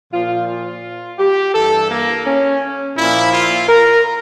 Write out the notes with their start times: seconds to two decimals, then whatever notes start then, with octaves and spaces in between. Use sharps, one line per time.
0.12 A#2 F3 F4
0.47 F4
1.18 G4
1.54 G2 E3 A4
1.89 A#3
2.26 C#4
2.96 A#2 F3 E4
3.32 F4
3.67 A#4